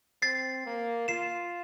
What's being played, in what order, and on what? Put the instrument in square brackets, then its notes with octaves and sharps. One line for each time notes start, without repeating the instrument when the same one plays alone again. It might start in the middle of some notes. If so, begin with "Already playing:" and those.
[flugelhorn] C4 [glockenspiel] A6 C7
[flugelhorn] A#3
[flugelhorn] F4 [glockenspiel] C7 E7